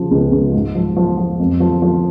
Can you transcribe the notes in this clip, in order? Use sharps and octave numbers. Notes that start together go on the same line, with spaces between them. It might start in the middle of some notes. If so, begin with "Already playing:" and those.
Already playing: C#3 F3
C#2
C#2
G#2
F3
F3
F3
F2
F3
F3